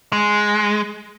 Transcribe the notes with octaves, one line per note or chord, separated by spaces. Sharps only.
G#3